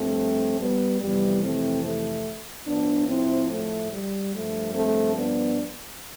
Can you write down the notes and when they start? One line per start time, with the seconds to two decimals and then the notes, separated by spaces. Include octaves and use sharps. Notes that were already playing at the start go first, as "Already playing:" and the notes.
Already playing: G2 F3 A3 C4
0.60 G3 B3
1.01 F2 C3 E3 G3 B3
1.42 A3 C4
1.84 A3
2.67 A2 F3 B3 D4
3.08 C4 E4
3.50 A3
3.91 G3
4.33 G2 F3 A3
4.74 A3 C4
5.16 B3 D4